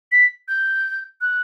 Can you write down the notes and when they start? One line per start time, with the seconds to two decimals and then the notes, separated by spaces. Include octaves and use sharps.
0.12 B6
0.48 G6
1.21 F#6